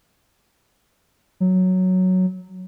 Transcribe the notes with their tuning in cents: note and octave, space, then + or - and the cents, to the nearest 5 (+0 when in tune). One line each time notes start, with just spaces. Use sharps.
F#3 +0